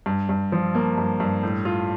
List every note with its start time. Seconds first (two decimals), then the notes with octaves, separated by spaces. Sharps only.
0.06 G2
0.29 G2
0.52 F3
0.75 A#3
0.98 G2
1.20 G2
1.43 A2
1.65 F4